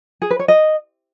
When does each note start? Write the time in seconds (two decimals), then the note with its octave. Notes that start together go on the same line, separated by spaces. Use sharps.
0.22 G#4
0.31 B4
0.39 C#5
0.48 D#5